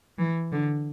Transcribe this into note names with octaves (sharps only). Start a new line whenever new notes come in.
E3
D3